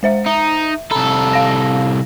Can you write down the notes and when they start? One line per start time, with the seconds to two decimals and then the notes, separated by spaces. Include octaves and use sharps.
0.03 G#3 C5 E5
0.26 D#4 E5
0.92 C2 A4 A#5 B5
1.33 F5 A#6